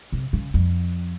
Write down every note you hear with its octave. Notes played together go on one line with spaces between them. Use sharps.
C3
C#3
F2